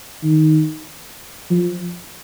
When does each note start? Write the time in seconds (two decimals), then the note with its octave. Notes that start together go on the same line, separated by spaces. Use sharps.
0.23 D#3
1.50 F3